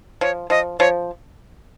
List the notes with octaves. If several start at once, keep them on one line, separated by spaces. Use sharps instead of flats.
F3 C#5
F3 D#5
F3 C#5